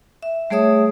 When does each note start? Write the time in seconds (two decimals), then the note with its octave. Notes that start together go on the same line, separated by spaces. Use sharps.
0.22 E5
0.50 G3 A3 G#4 C#5 E5 D#6